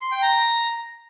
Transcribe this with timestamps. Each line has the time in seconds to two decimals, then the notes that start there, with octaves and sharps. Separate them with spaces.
0.02 C6
0.12 G5
0.22 A#5